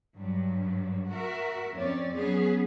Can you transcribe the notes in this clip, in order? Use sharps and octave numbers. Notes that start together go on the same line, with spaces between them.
G2 F#3
F#4 A#4 E5
F2 C4 C#4 C#5 D5
F#3 B3 C#4 G#4